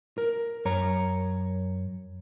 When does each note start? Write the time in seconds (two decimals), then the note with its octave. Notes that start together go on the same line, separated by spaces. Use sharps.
0.18 A#4
0.65 F#2 C#5 A#5